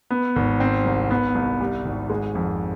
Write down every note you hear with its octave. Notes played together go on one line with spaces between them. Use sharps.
B3
G#1
C4
C2
B3
C2
G3
G#1
G#3
F2